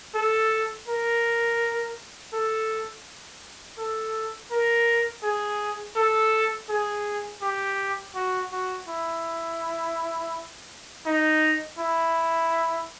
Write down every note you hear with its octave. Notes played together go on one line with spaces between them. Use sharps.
A4
A#4
A4
A4
A#4
G#4
A4
G#4
G4
F#4
F#4
E4
D#4
E4